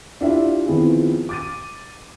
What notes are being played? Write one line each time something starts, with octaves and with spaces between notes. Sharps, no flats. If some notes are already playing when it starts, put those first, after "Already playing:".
D4 E4 F4 G4 E5
D#3 F3 B3 C4 E4 G#4
D6 A6 D#7